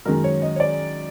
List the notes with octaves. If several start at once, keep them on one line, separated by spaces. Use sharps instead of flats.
F#2 D#3 G#3 A#4
C#5
D#5
C#5
D5